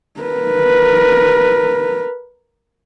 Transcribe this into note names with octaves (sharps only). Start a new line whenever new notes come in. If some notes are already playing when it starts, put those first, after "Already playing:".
A#4 B4